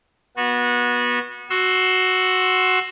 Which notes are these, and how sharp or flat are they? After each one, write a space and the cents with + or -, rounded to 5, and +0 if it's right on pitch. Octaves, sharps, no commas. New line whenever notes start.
B3 -25 F#4 -25
F#4 +0 C6 +20 E6 +0